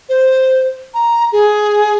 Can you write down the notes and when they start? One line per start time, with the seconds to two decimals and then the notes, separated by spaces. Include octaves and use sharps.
0.09 C5
0.94 A#5
1.32 G#4